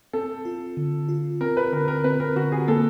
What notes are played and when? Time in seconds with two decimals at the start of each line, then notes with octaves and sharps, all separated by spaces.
0.13 C4 A4
0.45 F4
0.77 D3
1.09 F4
1.41 C4 A#4
1.57 B4
1.72 D3 A#4
1.88 A#4
2.04 C4 B4
2.20 A#4
2.36 D3 F#4
2.52 G#4
2.68 A#3 A4